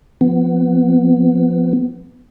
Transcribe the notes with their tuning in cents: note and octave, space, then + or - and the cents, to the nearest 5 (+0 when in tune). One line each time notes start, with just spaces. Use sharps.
F3 +0 B3 +15